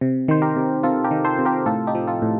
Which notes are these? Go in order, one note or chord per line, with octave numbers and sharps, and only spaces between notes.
C3
D#3 C5
G4 A#4
C3
C3 F4 A4
G4 A#4
D#3
A4 C5
C3
G4 A#4
A2 F4 A4
D#4 G4
F3
F4 A4
A2